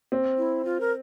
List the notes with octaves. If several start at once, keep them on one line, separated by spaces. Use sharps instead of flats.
C4
E4
F4
A#4